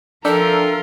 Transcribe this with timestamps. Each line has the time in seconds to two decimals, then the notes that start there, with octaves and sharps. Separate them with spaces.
0.25 F3 D4 F4 A4 A#4 E5 G5